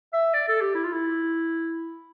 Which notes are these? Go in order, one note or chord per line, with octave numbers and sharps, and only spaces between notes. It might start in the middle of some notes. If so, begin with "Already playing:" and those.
E5
D5
A4
G4
E4
F4
E4